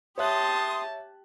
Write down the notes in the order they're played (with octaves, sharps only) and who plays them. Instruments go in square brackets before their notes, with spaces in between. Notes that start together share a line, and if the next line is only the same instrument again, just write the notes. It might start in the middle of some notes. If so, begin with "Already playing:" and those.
[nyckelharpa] G4 A5 [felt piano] C#5 E5 F#6 [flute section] C6 D#6